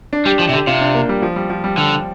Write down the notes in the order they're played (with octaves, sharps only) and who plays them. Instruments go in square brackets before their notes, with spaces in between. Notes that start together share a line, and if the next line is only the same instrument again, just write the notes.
[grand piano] D4
[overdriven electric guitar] G3 [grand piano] G4
[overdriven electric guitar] F3
C3
[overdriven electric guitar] D3 [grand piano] G4
[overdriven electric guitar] C3 [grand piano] F4
[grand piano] D4
A#3
G3
F3
G3
F3
G3
[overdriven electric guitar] D3 [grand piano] G3